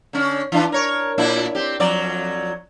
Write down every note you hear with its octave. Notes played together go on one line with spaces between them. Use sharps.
D3 C#4
E3 D4
A#4 C#5
A#2 D4 E4
C4 G4
F2 F#3 D5